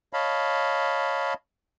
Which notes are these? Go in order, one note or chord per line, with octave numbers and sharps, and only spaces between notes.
C#5 D#5 F5 A5 B5